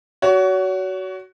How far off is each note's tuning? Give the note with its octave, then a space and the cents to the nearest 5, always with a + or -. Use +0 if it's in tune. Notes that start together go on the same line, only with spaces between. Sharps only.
F#4 +15 C#5 +35